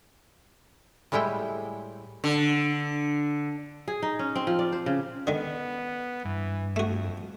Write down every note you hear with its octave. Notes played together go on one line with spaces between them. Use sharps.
A2 G3 G#3 E4 G5
D3
G#4
D#4
C#4
C4
F3
D5
C5
C#3
D3 D#3 B3
G2 E3
F2 A3 F#4